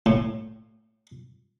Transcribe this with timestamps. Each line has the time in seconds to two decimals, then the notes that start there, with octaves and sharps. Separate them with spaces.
0.06 A2